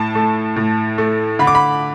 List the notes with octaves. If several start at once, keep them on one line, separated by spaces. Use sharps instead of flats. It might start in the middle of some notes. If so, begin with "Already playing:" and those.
Already playing: A2 A5
A3
A2
A3
D3 B5
D6
B5